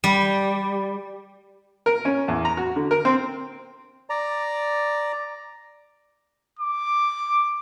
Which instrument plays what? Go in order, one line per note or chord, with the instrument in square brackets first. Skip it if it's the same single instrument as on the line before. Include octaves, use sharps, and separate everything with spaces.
[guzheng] G3
[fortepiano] A#4
C#4
E2
A#5
F#4
D3
A#4
C4
[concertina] D5 A#5
[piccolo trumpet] D6